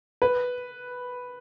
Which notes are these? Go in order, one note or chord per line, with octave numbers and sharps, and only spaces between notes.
B4